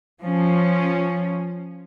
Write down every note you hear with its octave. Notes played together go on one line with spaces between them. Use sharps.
F3 C#4